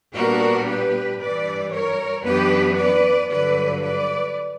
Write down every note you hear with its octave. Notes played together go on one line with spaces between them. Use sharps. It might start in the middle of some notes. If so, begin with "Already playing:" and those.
A#2 G3 B3 D4 F#4 A#4
G4 B4
G2 E3 G3 B4 D5
A#4 C#5
F#2 E3 B3 D4 G4 B4
B4 D5
G2 D3 F#3 B4 D5
B4 D5